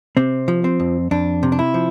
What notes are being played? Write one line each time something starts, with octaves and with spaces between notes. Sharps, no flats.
C3 C4
F3
C4
F2
F2 D4
C3
D4
E4
F3